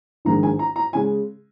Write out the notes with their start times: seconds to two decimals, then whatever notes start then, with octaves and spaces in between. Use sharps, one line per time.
0.25 A#1 G#2 D#3 G#3 A#5
0.43 G#5
0.59 A#5
0.76 A#5
0.93 C#3 G#3 G#5